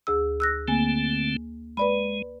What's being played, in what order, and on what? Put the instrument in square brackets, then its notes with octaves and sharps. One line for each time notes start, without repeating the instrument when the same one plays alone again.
[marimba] D2 G#4 E6
E6 F#6 A#6
[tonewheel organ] D3 A3 C4 [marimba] A#3 G#5
[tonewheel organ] G#3 [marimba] B4 D5 B5